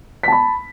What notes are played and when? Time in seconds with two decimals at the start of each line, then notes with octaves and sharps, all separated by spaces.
0.23 B6
0.28 A5
0.32 B5